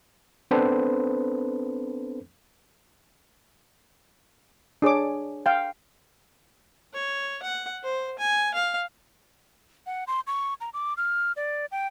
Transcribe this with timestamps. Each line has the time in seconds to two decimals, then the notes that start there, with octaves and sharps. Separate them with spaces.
0.51 B3 C4 D4 A4 B4 C5
4.82 D4 G#4 C#5 D6
5.46 F5 G5
6.94 C#5
7.43 F#5
7.83 C5
8.19 G#5
8.54 F5
9.86 F#5
10.07 C6
10.27 C#6
10.61 A#5
10.74 D6
10.97 F6
11.36 D5
11.72 G5